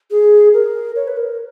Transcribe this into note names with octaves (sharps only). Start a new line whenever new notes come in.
G#4
A#4
C#5
B4
A#4